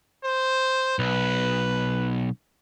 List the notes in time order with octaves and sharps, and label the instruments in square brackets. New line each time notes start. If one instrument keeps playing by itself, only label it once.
[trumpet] C5
[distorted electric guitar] B1 [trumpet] B4